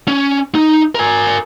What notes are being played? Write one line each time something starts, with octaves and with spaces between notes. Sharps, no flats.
C#4
D#4
A#4 G#5